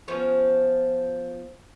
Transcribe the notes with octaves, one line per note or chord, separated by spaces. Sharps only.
F3 B3 C#4